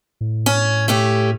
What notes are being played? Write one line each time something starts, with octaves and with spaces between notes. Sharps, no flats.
A2
C#4
A3 C#4 G4